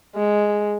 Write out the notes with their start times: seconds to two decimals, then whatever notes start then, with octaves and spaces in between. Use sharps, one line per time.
0.16 G#3